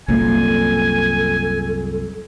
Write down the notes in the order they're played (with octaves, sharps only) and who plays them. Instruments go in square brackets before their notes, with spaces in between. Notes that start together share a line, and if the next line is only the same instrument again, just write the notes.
[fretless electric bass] C2 F#2 A#2 [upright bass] A#3 [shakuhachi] A4 [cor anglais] G#5